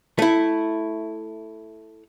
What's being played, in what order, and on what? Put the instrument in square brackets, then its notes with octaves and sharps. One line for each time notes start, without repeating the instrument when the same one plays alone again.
[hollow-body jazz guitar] A3 E4